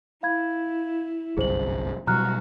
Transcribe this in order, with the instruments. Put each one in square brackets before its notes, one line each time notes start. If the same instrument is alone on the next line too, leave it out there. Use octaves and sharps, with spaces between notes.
[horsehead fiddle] E4 [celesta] F5 B5 G#6
[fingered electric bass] G1 C2 F#2 [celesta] G#4 C5 F#7
[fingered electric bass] B2 F#3 G3 [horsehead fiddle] F#4 [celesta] A#5 F6 F#6